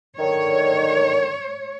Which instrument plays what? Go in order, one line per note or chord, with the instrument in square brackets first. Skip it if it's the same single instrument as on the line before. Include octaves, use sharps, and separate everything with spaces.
[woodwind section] D3 D#3 [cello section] C#5